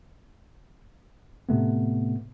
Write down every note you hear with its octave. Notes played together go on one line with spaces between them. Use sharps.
A2 C3 A3 B3